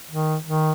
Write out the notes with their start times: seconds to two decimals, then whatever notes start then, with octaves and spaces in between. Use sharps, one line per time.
0.11 D#3
0.47 D#3